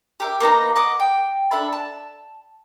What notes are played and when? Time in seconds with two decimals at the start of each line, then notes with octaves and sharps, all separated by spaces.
0.20 G4 A#4 E5
0.40 A#3 B3 D#4 A#5
0.76 D#5 F#5 D6 D#6
1.00 G5
1.51 D4 A4 E5 B5
1.73 A5